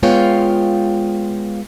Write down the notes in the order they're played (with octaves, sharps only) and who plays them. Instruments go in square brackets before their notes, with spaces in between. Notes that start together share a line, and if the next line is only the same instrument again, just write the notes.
[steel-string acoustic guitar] G#3 B3 F4 C#5 F5 G5